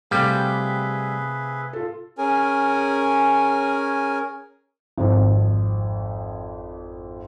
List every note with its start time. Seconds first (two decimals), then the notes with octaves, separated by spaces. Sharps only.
0.11 C3 G3 A3 F4 G4 G#4 B4 E5
1.73 F4 A4
2.18 C#4 G#4 A#4 G#5
4.97 G#1 F2